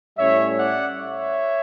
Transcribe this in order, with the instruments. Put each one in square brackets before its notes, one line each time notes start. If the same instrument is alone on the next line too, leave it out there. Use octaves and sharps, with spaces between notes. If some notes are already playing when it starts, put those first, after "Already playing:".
[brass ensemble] A2 G3 C#4 C#5 E5
D5 F#5
C#5 E5